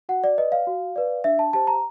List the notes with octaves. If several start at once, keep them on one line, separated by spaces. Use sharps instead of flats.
F#4 F#5
D5
B4 D5 D#5
F5
F#4
B4 D5
D4 E5
A5
G4 C5 A5
A#5